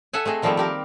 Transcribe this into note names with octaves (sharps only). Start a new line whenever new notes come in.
A4 E5 F#5 G#5
A3 C4 G#4 D#5
D#3 F3 G3 A3 A#3 C4
C4 G4 A#4